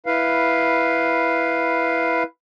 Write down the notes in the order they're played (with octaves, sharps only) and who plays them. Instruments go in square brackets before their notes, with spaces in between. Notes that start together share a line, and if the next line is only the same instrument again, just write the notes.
[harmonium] E4 B4 F5